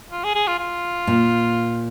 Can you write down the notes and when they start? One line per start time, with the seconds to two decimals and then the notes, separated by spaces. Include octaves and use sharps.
0.11 F4
0.24 G#4
0.35 G#4
0.47 F4
0.59 F4
1.07 A#2